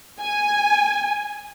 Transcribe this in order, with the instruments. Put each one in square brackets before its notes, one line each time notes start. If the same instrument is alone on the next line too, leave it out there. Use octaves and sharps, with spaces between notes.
[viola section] G#5